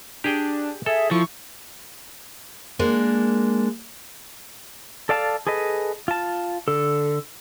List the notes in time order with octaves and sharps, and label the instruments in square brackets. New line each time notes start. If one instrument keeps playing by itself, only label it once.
[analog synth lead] D4 [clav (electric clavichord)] G4 G#4 G5
[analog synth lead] G#4 [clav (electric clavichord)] A4 [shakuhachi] E5
[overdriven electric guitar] F3 [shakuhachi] E4 [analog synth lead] C#6
[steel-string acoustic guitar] G#3 A#3 D4
[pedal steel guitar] A4 D5 F5 A5
G#4 A4 B4 D#5
F4 A5
D3 A4